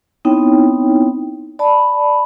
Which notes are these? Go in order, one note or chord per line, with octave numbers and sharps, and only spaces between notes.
B3 C4 D#4 E4 C#5 G5
D5 A5 B5